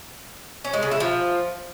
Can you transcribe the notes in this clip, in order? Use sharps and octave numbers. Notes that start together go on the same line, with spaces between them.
C#4
G#3
C#3
E4
F3